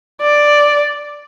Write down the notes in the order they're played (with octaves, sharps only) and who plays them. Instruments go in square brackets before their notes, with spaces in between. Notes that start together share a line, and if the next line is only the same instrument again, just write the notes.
[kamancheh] D5